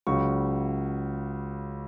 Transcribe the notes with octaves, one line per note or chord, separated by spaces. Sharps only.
C#2 C#3 F#3 C#6